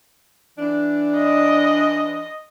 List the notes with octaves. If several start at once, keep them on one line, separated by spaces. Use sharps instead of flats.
E3 D4
D#5